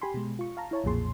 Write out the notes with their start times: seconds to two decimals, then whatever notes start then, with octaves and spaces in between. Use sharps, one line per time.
0.02 G4 G#5 B5 C6
0.14 B2 G#3
0.39 F4 C#6
0.57 F5 A5 A#5
0.71 E4 C#5 A5
0.84 B1 F2 A#2 G#4 C6